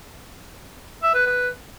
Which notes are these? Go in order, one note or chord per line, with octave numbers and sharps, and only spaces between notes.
E5
B4
B4